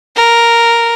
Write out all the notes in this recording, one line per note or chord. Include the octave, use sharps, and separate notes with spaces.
A#4